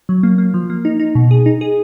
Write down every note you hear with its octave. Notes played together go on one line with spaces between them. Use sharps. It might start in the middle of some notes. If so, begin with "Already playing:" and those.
F#3
A#3
A#3
F3
A#3
D#4
D#4
B2
G#4
D#4
G#4